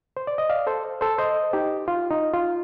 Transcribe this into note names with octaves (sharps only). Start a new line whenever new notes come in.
C5
D5
D#5
D5 F5
A4 C5
A4 C5
C5 D#5
D#4 G4
F4
D#4
F4